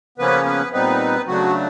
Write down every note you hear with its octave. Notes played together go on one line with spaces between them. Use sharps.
C#3 F3 A#3 B3 C#4 B4
B3 B4
A#2 G3 B3 C4 D#4 B4
C#3 F#3 A3 D4 F#4